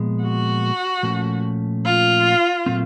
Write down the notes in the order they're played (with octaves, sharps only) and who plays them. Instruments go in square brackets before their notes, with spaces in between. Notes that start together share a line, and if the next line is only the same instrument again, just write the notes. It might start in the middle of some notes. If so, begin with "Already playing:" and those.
Already playing: [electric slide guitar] A#2 F3 G#3 B3
[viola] F#4
[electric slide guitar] A#2 F3 A3 C#4
[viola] F4
[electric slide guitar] A#2 F#3 A3 C4